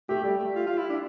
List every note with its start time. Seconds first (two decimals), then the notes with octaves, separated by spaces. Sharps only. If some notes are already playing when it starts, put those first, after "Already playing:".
0.09 A3 G4
0.24 G3
0.39 A3
0.55 F4
0.66 F4
0.78 E4
0.90 D4